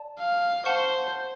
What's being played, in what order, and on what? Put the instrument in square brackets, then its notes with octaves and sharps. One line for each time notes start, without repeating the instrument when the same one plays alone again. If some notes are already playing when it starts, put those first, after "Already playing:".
Already playing: [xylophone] D5 A5
[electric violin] F5
[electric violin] C5 [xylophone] F#5 A5 C#6